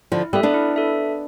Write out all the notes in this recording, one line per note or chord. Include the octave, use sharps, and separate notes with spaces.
D3 F3 E4
G3 B3 A4 E5
B3 D4
E4
A4 E5